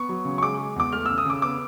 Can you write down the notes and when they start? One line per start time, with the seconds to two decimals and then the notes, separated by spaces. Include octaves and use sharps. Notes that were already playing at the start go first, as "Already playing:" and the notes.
Already playing: B3 C#6
0.09 F#3
0.25 C#3
0.38 C#6
0.42 G#3 D6
0.59 G#3
0.76 E2 D6
0.92 A3 F6
1.06 C#3 E6
1.18 D#6
1.25 C#3 D6
1.42 B3 D6